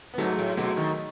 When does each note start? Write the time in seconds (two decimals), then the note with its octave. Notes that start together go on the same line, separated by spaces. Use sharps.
0.14 B3
0.18 G#2 F#3 A3
0.38 A2
0.57 B2 F#3 A3
0.77 D#3